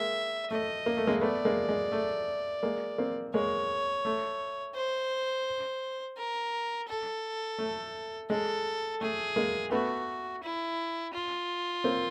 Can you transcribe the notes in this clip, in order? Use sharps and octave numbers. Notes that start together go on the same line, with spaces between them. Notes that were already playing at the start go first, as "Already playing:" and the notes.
Already playing: G#3 A#3 E5
A3 D#5
A#3
A3
G#3 A#3
A3 B3 D5
G#3 A#3
G#3
A3
G#3 A#3
A#3 C4
G#3 A#3 C#5
A3
C5
A#4
A4
A3
G#3 A4
A3 G#4
G#3 A#3
A3 B3 F#4
E4
F4
A#3 C4